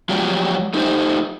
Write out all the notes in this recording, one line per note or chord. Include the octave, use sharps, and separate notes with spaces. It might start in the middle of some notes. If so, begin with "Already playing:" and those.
F3 F#3 G#3 G4 C#5 D5
A3 D#4 G4 C5